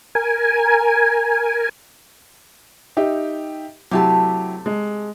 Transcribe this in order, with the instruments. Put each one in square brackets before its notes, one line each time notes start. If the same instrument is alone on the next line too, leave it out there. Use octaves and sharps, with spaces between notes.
[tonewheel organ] A#4 G#5
[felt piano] D#4 G4 E5
[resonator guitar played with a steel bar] C3 A3 A5 [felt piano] F#3 E4 G4
[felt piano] G#3